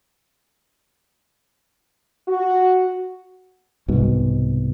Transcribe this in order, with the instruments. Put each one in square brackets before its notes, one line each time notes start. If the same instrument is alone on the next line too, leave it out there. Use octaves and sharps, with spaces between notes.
[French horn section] F#4
[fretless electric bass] C2 G#2 B2